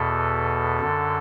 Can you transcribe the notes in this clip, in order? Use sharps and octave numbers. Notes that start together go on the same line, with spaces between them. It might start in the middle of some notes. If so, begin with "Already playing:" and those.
Already playing: E2 B2 A4
F#2 D3